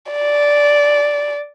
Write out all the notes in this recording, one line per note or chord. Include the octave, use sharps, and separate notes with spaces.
D5